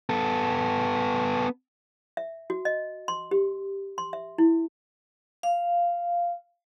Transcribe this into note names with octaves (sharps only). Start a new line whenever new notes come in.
B3 A4
E5
F#4
D#5
C6
G4
C6
E5
E4
F5